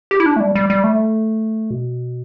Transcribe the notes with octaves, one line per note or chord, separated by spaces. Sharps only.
G4
E4
D4
A3
G3
G3
G3
A3
B2